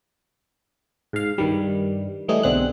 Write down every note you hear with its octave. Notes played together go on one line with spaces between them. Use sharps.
G#2 F5
G2 D#3 G3
E3 G3 A3 D#4 G#4
B1 D3 C4 G#4 F#6